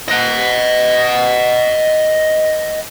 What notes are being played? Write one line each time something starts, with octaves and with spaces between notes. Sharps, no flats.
D#5 F#5